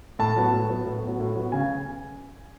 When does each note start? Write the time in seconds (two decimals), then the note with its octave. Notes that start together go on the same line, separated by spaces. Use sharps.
0.19 A2 A5
0.36 F#3 B3
0.53 A2
0.69 F#3 B3
0.85 A2
1.03 F#3 B3
1.20 A2
1.35 F#3 B3
1.52 C#3 G#5